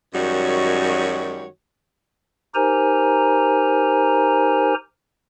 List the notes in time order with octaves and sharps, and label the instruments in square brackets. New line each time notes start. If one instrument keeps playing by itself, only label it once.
[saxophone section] F#2 D#3 G3 G#3 F#4 C#5
[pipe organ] D#4 G4 A#4 C5 G#5 A#5